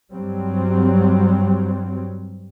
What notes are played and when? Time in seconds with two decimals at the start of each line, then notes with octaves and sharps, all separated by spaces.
0.13 G2 F#3 G3 C4